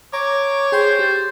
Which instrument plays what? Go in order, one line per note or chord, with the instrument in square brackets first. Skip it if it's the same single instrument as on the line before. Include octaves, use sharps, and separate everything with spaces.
[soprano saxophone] C#5 [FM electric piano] A#5 [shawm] D6
[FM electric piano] G#4 G5 C6 [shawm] C5
[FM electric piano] G4 A6